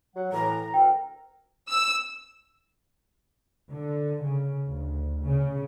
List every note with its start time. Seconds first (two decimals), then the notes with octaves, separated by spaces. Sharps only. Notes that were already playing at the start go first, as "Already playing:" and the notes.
0.16 F#3 F#5
0.33 A2 E3 A#5
0.74 D2 A4 A#4 G5
1.70 E6
3.70 D3
4.26 C#3
4.68 D2
5.24 C#3